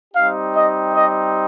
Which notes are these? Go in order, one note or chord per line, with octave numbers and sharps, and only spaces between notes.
G3 C4 D#4 G4 F5
D#5
D#5